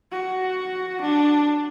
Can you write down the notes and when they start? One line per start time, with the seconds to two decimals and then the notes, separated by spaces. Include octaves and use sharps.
0.11 F#4
1.01 D4